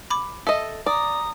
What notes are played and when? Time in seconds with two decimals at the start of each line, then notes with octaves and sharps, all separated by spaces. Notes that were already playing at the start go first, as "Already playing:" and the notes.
0.10 B5 D6
0.47 A4 D#5 E5
0.86 D5 A#5 D#6